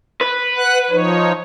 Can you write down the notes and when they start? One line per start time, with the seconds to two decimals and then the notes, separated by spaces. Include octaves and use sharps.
0.21 B4
0.56 F#5 F#6
0.90 F3 D#4 C#5